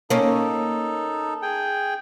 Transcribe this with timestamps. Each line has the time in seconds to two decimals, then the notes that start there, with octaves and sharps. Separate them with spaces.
0.10 A#3 C#4 D#4 A4
1.42 G#4 G5